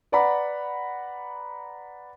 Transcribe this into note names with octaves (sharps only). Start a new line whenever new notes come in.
B4 D5 F#5 A#5 B5